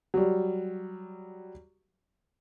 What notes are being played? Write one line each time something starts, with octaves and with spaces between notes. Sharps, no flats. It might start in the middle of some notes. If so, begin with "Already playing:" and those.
F#3 G3